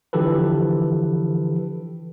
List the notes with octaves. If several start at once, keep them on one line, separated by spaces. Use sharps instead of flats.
D3 E3 F3 G4 A4 B4